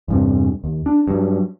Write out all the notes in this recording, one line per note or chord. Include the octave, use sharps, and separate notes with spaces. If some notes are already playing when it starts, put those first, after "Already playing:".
E2 G2 C3
D#2
D4
G2 F#3